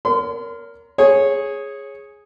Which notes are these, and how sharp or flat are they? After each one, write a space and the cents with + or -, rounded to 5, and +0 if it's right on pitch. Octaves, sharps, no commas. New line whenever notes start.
A#4 +0 C#5 +35 C6 -40
G#4 +0 C#5 -15